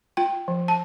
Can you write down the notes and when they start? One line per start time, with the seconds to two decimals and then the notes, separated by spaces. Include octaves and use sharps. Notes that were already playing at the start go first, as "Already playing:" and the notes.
0.17 F4 G5
0.48 F3
0.68 A5